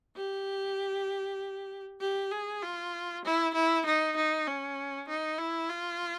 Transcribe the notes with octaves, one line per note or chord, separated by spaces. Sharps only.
G4
G4
G#4
F4
E4
E4
D#4
D#4
C#4
D#4
E4
F4